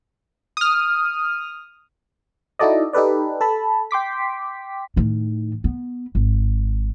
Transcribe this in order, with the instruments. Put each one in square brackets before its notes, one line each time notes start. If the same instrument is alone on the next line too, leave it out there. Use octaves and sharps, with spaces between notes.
[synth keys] D#6 F6
[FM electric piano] D#4 E4 F#4 A4 D5 D#5
D#4 G4 A4 B4 D5
A4 A5 B5
G5 C6 D6 B6
[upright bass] A2 D#3
B3
G#1